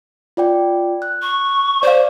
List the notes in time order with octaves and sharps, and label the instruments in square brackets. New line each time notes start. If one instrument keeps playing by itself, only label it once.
[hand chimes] F4 D5 G5
F#6
[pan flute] C#6
[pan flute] C5 [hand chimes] D5 F5